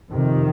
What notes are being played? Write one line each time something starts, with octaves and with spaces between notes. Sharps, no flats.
F2 C3 D#3